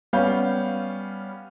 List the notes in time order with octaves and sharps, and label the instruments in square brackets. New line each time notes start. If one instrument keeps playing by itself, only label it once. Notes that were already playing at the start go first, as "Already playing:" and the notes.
[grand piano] G3 B3 C#4 F5 G6